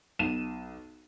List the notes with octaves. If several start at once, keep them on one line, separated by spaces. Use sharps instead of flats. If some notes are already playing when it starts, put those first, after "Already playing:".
B1 D#7 E7